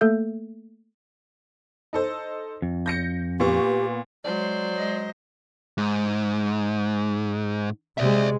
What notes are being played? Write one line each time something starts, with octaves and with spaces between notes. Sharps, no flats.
A3 A#3 A4 E5 G6
D#4 A4 C5
F2
G6 A#6 C#7
A#2 B3 G4 C#6
F#3 G#3 C5 D5
G#3 D#5
G#2
C3 G#3 D5 E5